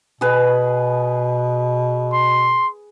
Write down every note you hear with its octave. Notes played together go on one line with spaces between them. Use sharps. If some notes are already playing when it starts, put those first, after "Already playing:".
B2 G#4 B4
C6